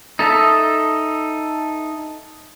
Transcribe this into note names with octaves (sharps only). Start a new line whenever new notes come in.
D#4 A4 E5